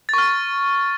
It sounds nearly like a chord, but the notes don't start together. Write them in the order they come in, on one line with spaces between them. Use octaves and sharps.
A6 C#6 F6